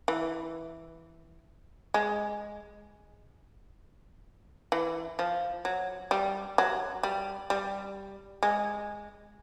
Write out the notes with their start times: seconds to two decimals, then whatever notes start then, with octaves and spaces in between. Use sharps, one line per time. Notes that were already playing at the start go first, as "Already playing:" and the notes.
0.08 E3
1.94 G#3
4.72 E3
5.19 F3
5.65 F#3
6.11 G3
6.58 F#3
7.03 G3
7.50 G3
8.43 G#3